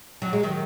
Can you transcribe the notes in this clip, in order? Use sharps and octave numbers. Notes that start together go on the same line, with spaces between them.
F#3
G#3
D#3 F#3